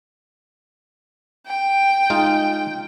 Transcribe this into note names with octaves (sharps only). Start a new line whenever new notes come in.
G5
G#3 D#4 F4